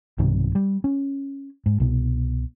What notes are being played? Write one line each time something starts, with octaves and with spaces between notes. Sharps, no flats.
B1 G2 C3 D#3
G3
C#4
G#2
C2 B2